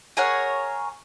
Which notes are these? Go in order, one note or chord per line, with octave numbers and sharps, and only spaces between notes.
G#4 A#4 C#5 F#5